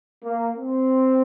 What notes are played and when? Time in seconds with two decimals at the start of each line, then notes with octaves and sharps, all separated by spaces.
0.24 A#3
0.56 C4